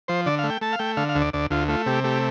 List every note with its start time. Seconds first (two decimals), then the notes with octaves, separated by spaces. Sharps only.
0.08 F3 C5
0.26 D3 D5
0.39 F5
0.44 A3
0.50 G5
0.61 A3 A5
0.73 F5
0.79 A3 G5
0.97 D3 F5
1.09 F5
1.15 D2
1.22 D5
1.33 D2 D5
1.51 D2 F4
1.69 A3 F4
1.86 C3 G4
2.04 A3 G4